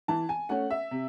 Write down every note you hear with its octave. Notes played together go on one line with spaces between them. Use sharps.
E3 A5
G#5
A3 C#4 F#5
E5
C3